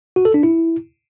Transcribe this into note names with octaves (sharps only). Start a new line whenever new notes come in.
F#4
A4
D4
E4